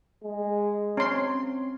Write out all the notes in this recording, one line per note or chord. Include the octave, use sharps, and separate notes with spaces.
G#3
C4 C#4 C6